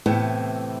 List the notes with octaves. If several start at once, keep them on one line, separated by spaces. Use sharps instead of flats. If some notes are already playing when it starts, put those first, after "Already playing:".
A2 C3 E3 B3